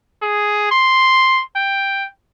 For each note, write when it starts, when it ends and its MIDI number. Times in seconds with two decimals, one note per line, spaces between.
0.22 0.70 68
0.71 1.42 84
1.56 2.07 79